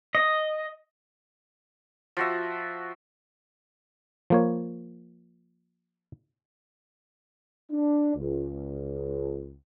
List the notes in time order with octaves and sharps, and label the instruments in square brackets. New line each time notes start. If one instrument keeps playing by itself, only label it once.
[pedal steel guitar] D#5
[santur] F3 F#4 E5
[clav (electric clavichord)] F3 A#3 C#5
[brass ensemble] D4
C#2